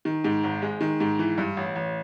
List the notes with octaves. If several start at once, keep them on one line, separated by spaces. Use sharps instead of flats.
D#3
G#2
G#1
G#3
D#3
G#2
E3
G2
A1
A1